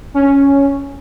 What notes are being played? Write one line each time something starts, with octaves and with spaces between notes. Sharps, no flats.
C#4